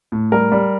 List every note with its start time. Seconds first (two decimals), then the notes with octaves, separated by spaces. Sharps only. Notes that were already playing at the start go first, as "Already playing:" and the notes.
0.12 A2
0.32 G3 A#4
0.52 G3